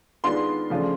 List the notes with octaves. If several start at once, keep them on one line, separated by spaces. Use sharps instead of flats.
D#3 G#3 B3 D4 F4 C6
C#3 F3 A3 D4 F4